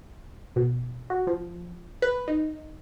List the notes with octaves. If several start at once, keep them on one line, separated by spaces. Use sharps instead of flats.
B2
F#4
F3
B4
D#4